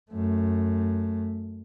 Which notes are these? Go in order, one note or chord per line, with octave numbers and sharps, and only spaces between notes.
F#2 A3